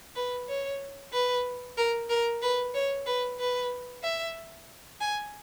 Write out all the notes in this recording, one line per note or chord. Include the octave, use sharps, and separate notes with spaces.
B4
C#5
B4
A#4
A#4
B4
C#5
B4
B4
E5
G#5